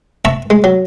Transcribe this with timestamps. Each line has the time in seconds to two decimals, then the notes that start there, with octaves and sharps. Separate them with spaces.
0.25 E5 A5 A#5 C#6
0.50 G#3
0.64 F#3